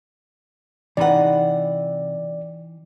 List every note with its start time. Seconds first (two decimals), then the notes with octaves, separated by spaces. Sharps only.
0.97 C3 E3 D#4 B4 D5 F#5